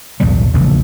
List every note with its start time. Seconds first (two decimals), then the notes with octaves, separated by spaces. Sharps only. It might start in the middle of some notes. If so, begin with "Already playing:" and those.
0.20 B1 E2 A2 G3
0.54 E1 A#1 C#3